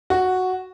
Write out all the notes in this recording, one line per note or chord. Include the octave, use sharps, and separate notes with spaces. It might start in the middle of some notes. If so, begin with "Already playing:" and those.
F#4